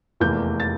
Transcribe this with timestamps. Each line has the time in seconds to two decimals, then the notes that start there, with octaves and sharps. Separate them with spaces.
0.20 F1 E2 E3 A#3 G6
0.60 A6